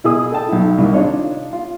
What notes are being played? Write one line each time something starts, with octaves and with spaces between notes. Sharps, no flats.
B2 E4 G#4 D#6
A4 G5 A5
B1 E4
C2 D#3
D4 D#4 F4 C#5 D#5
F4